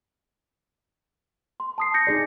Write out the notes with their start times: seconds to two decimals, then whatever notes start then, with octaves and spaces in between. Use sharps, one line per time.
1.60 C6
1.78 A5 D#6 C7
1.94 G6 A#6 C#7
2.07 D#4 G#4 D5